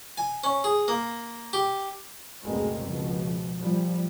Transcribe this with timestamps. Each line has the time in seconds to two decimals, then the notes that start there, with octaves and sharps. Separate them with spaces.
0.18 G#5
0.44 C#4
0.64 G#4
0.88 A#3
1.53 G4
2.44 F#1 D2 B2 G#3 A#3 C4
2.82 C#2 B2 F3
3.55 A#2 F3 G3